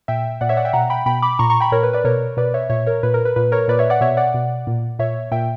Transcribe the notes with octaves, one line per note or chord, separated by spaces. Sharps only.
A#2 E5 G5
A#2 D5 F#5
C#5 E5
D5 F#5
E5 G5
B2 F#5 A#5
G5 B5
B2 G5 B5
B5 D6
A#2 A#5 C#6
A#5 C#6
G5 B5
A#2 A#4 C#5
B4
B4 D5
B2 A#4 C#5
B2 B4 D5
C#5 E5
A#2 C#5 E5
A#4 C#5
A#2 B4
A#4
B4
A#2 B4
A#4 C#5
A#2 B4 D5
C#5 E5
D5 F#5
B2 C#5 E5
D5 F#5
B2
A#2
A#2 C#5 E5
A#2 E5 G5